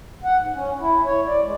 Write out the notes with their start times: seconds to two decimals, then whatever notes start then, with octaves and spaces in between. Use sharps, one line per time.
0.24 F#5
0.38 G#2
0.53 C#4
0.80 E4
1.05 C#5
1.27 D5
1.42 G#3